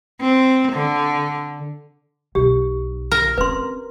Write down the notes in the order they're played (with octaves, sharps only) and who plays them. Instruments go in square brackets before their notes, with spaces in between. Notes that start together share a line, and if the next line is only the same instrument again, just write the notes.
[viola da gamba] C4
D3
[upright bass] B1 [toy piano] G4
[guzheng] A#4
[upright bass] C4 C#4 [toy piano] B4 C6